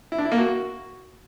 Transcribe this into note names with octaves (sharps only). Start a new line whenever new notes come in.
E4
D4
E4
A#3
F#4